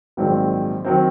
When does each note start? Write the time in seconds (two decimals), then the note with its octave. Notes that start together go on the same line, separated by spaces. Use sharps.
0.17 A#1 G#2 D#3 F#3 C4
0.85 D#3 F#3 C4